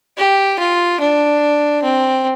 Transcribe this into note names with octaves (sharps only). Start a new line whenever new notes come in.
G4
F4
D4
C4